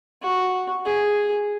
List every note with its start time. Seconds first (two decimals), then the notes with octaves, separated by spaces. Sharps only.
0.22 F#4
0.85 G#4